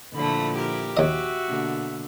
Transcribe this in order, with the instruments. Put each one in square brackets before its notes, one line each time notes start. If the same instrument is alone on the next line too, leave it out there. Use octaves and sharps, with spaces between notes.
[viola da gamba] A#2 F3 E4 [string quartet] D3 A3 [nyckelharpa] B5
[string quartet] G4 [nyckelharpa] A#4
[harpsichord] D#2 D#5 [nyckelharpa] F#4 E5
[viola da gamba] B2 D3 A#3